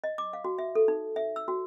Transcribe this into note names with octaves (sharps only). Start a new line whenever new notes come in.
D#5
D6
F5
F#4
E5
A4
D#4
E5
E6
F#4